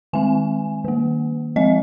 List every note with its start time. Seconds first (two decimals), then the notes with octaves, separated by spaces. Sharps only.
0.13 D#3 G#3 C4 G#5
0.84 D#3 A#3
1.56 F3 G#3 C4 D#5